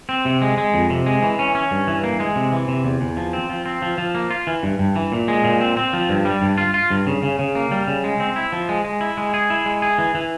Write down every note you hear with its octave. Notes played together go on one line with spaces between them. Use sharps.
C4
C3
G#3
G#3
F2
C3
G#3
E3
C#4
C#4
G2
E3
A#3
G#3
C3
E3
C3
E2
E2
F3
C4
F3
C4
F3
F3
A#3
F4
E3
G2
G2
E3
A#2
G#3
A#2
C4
C4
F3
G2
G3
G2
F4
F4
G2
C#3
C#3
C#3
A#3
G3
C#3
G#3
C4
E4
F3
G#3
G#3
E4
G#3
G#4
E4
G#3
G#4
E3
E3